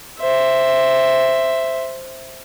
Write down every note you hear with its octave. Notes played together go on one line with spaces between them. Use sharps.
C5 E5